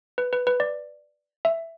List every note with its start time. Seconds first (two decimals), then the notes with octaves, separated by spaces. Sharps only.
0.18 B4
0.33 B4
0.47 B4
0.60 D5
1.45 E5